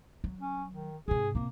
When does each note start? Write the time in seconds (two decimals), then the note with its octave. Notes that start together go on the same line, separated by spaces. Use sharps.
0.24 F#3
0.40 C#4
0.71 D#3
1.08 G#2 C3 G#4
1.35 A2 C3 A#3